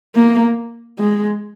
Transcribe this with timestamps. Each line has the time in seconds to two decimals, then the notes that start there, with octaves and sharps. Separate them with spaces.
0.15 A#3
0.99 G#3